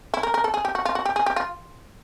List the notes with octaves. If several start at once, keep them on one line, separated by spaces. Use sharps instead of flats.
E4
A#4
A#4
A4
G#4
G4
F#4
F4
F#4
G4
G#4
G4
F4